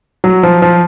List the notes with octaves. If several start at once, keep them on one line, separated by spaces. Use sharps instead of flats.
F#3
F3
F3